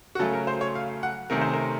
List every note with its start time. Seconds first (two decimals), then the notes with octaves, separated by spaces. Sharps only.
0.15 F#4
0.19 C#3 F#3 A3 C#4 A4
0.33 A#4
0.47 C5
0.61 C#5
0.75 F5
1.03 F#5
1.30 C3 D#3 A3 C#4 A#4
1.41 C5
1.54 A#4